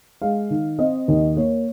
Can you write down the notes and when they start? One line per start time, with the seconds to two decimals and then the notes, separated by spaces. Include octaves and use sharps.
0.22 G#3 F5
0.50 D#3
0.79 C4 D#5
1.08 D#2
1.37 A#3 C#5